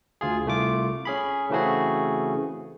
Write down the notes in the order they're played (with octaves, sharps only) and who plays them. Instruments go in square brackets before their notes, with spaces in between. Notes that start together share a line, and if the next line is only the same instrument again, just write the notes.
[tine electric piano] D2 F4 G#4
C2 A3 F4 D6
C#4 G#4 B5
C#3 E3 A3 C4 F#4 G#4